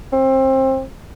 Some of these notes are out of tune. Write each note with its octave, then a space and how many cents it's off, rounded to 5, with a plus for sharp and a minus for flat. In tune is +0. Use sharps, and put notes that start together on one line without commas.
C4 +25